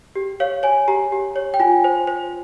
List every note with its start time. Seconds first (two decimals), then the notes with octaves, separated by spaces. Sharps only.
0.16 G4
0.40 C#5 F5
0.63 C#5 G#5
0.88 G4 A#5
1.12 G4
1.36 C#5
1.54 G5
1.60 F4 G#5
1.84 C5
2.07 C5